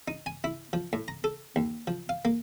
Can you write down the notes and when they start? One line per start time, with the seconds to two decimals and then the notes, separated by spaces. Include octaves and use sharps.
0.08 D#4
0.26 G#5
0.44 E4
0.73 F3
0.93 A2
1.08 A#5
1.24 A4
1.56 D#2
1.87 F3
2.09 F5
2.25 A#3